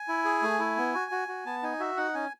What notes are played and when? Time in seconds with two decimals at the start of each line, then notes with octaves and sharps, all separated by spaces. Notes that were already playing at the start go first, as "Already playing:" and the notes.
Already playing: G#5
0.08 E4
0.25 G#4
0.42 A3
0.59 E4
0.77 B3
0.95 F#4
1.12 F#4
1.28 F#4
1.46 B3 A5
1.63 D#4 G#5
1.80 F#4 E5
1.97 D#4 F#5
2.14 C#4 G#5